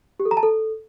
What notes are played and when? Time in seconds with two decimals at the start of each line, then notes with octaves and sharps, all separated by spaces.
0.20 G4
0.25 A4
0.31 A#5
0.37 A5
0.43 A4